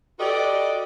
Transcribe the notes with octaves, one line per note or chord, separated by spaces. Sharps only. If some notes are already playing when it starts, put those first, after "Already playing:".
F#4 G4 A4 B4 D5 D#5